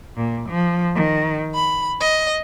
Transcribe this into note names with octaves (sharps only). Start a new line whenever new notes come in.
A#2
F3
D#3
B5
D#5